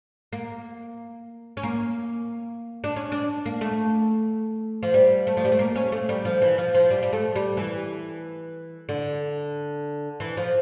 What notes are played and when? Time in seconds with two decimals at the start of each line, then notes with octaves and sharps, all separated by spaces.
0.33 A#3
1.57 C#4
1.63 A#3
2.84 D4
2.96 C#4
3.12 D4
3.46 A#3
3.61 A3
4.83 F3
4.94 G3
5.27 A3
5.37 F3
5.45 G3
5.52 A3
5.59 A#3
5.76 C#4
5.92 A3
6.09 G3
6.25 F3
6.42 E3
6.58 F3
6.75 F3
6.90 G3
7.03 G3
7.13 A3
7.36 G3
7.57 E3
8.89 D3
10.20 E3
10.37 F3